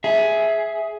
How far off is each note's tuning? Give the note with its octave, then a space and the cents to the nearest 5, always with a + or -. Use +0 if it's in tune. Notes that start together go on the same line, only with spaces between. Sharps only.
G#4 +10 E5 -5